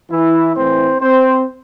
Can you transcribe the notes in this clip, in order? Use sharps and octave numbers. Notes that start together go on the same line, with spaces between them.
E3 E4
A2 E3 C4 C5
C4 C5